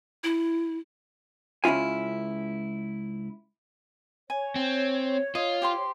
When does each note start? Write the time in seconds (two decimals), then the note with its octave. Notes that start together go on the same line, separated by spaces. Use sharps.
0.24 E4
1.64 C#2 C#4 E4 F4 G#5
4.30 C#5 G#5
4.56 C4
5.35 F4 D#5
5.62 G4 C5 C6